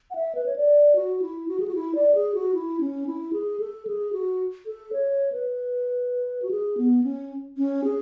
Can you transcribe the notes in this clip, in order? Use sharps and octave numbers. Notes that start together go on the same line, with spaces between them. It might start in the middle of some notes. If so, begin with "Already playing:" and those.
F#5
E5
B4
C#5
D5
F#4
E4
F#4
G#4
F#4
E4
D5
G#4
F#4
E4
C#4
E4
G#4
A4
G#4
F#4
A4
C#5
B4
F#4
G#4
B3
C#4
C#4
G#4